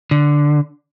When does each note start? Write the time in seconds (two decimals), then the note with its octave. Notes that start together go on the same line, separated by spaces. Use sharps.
0.11 D3